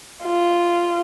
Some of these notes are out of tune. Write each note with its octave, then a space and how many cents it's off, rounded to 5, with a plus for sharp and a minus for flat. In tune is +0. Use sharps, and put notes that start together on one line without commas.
F4 -10